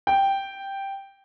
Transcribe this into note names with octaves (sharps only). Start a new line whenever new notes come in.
G5